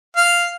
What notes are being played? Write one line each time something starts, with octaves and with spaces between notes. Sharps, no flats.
F5